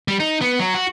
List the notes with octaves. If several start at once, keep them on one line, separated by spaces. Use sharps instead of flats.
G3
D#4
B3
F#3
F#4